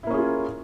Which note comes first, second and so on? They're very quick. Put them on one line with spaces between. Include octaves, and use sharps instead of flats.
E4 A#3 C#4 G#4 F4